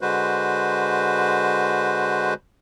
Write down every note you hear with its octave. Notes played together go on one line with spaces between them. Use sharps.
D3 G#3 F#4 B4 C5